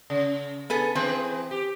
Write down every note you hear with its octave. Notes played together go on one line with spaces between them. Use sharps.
C#3
B3 G#4 A4
E3 C4 G#4 B4
G4